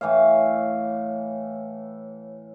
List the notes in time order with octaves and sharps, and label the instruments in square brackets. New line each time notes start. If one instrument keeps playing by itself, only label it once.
[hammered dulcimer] A2 E3 C#5 F5